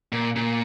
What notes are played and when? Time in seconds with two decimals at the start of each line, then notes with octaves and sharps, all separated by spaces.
0.12 A#2
0.36 A#2